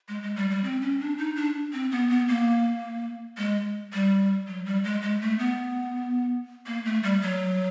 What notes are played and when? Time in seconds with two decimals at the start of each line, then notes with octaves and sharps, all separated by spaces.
0.08 G#3
0.23 G#3
0.36 G3
0.50 G3
0.64 C4
0.82 C#4
1.00 D4
1.18 D#4
1.36 D4
1.73 C4
1.92 B3
2.09 B3
2.28 A#3
3.38 G#3
3.93 G3
4.48 F#3
4.66 G3
4.84 G#3
5.02 G#3
5.21 A3
5.39 B3
6.67 A#3
6.85 A3
7.03 G3
7.22 F#3